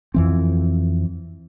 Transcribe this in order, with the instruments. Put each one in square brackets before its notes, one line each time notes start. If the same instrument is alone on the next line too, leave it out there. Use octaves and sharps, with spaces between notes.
[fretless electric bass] F2 E3 C4